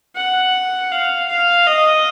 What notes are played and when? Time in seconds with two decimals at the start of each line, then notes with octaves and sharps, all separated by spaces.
0.16 F#5
0.91 F5
1.29 F5
1.67 D#5